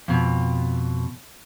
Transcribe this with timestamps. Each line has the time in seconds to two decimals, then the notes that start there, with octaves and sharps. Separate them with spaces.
0.08 F2 B2